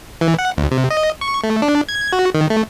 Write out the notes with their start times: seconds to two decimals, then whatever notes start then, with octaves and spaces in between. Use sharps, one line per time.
0.21 E3
0.39 F#5
0.57 D2
0.71 C3
0.90 D#5
1.21 C#6
1.44 A3
1.62 D4
1.89 G#6
2.13 F#4
2.35 D#3
2.50 A3